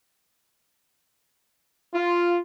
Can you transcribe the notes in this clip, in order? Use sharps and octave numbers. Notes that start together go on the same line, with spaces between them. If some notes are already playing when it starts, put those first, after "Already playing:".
F4